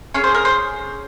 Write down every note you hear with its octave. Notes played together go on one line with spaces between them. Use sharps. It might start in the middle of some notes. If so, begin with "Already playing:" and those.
C#4 G#4 C#5
C5
A#4
C5